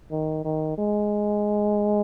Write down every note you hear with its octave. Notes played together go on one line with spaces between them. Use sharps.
D#3
D#3
G#3